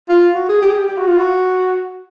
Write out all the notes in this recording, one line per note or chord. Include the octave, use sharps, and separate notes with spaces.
F4
F#4
G#4
G4
G#4
G4
G4
F#4
F4
F#4